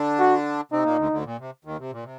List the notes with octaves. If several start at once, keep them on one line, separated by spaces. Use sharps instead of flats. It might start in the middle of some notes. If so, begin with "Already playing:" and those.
Already playing: D3 D4
F#4
C3 C4 D#4
A#2 A#3
D2 D3
D2 D3
A#2
C3
D#2 D#3
C3
A#2
C3